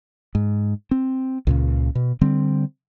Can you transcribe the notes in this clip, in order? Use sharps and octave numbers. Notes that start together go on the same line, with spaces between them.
G#2
C4
C#2 A#2 C#3
B2
D3 G3 C4